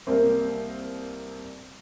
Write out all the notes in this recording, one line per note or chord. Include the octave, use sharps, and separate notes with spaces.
C2 A#3 C4